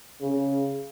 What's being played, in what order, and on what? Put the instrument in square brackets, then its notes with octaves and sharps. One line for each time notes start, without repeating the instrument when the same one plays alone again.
[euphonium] C#3